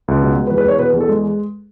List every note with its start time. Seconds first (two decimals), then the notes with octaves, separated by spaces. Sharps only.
0.08 C#2
0.23 B2
0.36 G#3
0.47 B4
0.51 E2
0.58 B4
0.65 E2 C#5
0.79 B2 B4
0.93 E2
1.01 A4
1.09 G#3